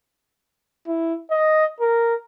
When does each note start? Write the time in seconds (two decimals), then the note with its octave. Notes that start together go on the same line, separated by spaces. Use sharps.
0.87 E4
1.30 D#5
1.80 A#4